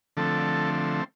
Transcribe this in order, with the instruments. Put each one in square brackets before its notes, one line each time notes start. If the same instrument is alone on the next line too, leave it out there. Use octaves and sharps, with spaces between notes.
[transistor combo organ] D3 F3 A3 C4 A4